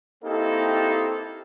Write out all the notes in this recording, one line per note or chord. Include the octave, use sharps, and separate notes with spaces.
A#3 C4 D#4 E4 G4 A4